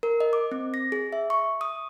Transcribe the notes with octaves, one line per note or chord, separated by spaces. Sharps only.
A#4
D#5
D6
C4
A#6
G#4
E5
C#6
D#6